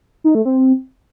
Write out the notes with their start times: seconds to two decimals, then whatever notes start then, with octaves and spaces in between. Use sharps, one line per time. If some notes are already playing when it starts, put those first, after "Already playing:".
0.24 D#4
0.35 A3
0.45 C4